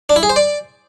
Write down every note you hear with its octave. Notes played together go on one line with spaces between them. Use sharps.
D4
E4
G#4
C5
D5